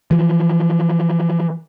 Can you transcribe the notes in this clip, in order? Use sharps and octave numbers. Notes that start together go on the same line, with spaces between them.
E3 F3